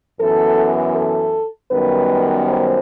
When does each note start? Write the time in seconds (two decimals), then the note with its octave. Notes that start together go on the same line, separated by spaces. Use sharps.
0.19 F#2 E3 B3 A4
0.94 A4
1.71 F#2 D#3 G3 B3 B4
2.46 C5